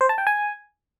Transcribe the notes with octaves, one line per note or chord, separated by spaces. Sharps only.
C5
A5
G5
G#5